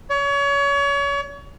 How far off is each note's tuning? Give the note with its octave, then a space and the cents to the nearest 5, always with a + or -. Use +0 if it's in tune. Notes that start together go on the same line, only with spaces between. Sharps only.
C#5 +30